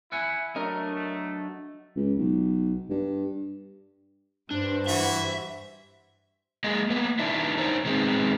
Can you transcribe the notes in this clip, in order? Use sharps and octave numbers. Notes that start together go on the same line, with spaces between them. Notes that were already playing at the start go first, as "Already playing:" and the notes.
E4 E5 F#5 G#5
F#3 A3 D4 A#4 D#5
A3
C#2
B1
G2
G2 D4 C5
E3 F#4 E5
G#3 A#3 G#4 D#5
A#3 B3
D#3 G3 D4 E4
D#4 A#4 C5 C#5
B2 D#3 G#3 A3 B3 C4